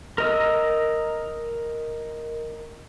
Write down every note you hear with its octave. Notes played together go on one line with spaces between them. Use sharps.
A#4 D#5 E6